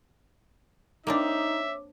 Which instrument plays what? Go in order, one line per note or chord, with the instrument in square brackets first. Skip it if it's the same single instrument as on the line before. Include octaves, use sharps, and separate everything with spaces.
[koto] A#3 C4 D4 [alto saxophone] D#4 [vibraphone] C#5 D6 [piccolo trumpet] E5